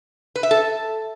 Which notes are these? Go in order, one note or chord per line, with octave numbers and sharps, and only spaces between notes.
B4
E5
A4